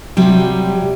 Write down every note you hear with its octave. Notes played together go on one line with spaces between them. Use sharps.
C3 F#3 G3